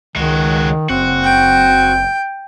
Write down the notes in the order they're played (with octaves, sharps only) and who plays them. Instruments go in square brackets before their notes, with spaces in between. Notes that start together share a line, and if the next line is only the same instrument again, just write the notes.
[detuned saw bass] C#2 [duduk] D#3 [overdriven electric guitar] G#3 F#4
[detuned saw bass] F#1 [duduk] C4 [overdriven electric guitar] F#4
[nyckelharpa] G5